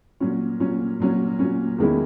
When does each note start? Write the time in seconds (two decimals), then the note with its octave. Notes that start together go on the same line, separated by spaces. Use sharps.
0.20 A#2 F#3 C#4
0.60 A#2 F#3 C#4
1.00 A#2 F#3 C#4
1.39 A#2 F#3 C#4
1.78 E2 D#3 G#3 C#4 E4